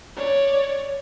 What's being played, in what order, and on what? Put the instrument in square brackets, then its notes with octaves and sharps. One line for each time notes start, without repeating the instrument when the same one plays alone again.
[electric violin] C#5 D5